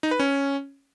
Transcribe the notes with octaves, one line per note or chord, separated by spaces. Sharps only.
D#4
B4
C#4